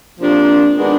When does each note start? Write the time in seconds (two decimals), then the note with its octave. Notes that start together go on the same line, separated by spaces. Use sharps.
0.18 C3 F3 A#3 D4
0.77 D#3 G#3 B3 D4